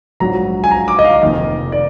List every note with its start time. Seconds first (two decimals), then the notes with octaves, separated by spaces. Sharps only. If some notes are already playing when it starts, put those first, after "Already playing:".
0.20 A#1 G#2 F#3 A#5
0.64 G#5
0.71 A#5
0.88 D6
0.99 D#5
1.05 F5
1.22 F1 F2 D#3 A#3 D#5
1.72 D5